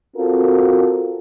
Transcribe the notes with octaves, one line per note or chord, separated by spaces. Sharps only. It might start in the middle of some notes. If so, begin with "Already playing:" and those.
C4 F4 F#4 A4 A#4